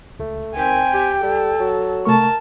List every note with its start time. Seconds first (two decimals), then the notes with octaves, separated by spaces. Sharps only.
0.20 C#2 A3
0.56 D#3 C4 G5 G#5
0.93 G4
1.23 G3 A4
1.59 F#3
2.05 C3 A3 A#4 A5 C#6